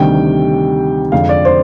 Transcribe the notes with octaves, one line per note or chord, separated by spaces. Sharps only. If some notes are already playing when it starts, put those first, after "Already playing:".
Already playing: D2 C3 D#3 G3 G5
F2 D3 G#3 F5
D5
C5